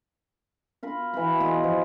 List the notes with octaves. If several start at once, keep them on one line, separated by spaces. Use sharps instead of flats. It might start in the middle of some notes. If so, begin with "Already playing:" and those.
F4 A#4 B5
E3 F#4 B5
F4 G#4 B4 D#5
F3